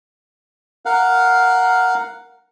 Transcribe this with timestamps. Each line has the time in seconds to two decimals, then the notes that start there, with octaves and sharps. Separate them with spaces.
0.86 A#4 F5 F#5